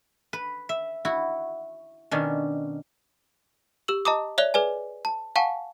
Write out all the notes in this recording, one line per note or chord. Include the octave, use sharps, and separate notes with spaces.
B4
E5
E4 F#4
B2 D#3 C#4 D4
G4 E6 F#7
D#5 A5 A#5 D6 D#6
C#5 D5 E5 F#6 F7 G7
G#4 B4 D5 G#5
A5
F5 F#5 G#5 A5 C#6